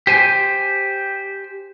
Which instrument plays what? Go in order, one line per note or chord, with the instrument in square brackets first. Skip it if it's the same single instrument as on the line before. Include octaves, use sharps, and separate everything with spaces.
[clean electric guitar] G4 C5 G#5